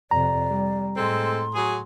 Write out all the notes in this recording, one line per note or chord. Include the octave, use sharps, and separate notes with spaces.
F2 C3 D5 A#5
G3
A2 G#3 C4 A4 C6
F#3 G#4